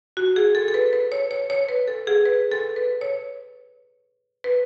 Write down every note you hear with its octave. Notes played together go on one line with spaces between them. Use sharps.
F#4
G#4
A4
A4
B4
B4
C#5
C#5
C#5
B4
A4
G#4
B4
A4
B4
C#5
B4